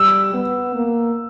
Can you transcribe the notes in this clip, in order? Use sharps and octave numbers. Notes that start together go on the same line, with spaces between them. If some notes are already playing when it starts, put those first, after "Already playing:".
Already playing: G3 E6
B3
A#3